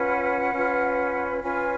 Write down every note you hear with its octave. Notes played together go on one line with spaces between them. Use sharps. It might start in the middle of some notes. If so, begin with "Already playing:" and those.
Already playing: C#4 F4 B4 F#5
C#4 F4 B4
C#4 F4 B4 G#5